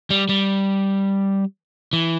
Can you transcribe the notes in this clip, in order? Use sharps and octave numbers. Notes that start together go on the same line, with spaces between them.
G3
G3
E3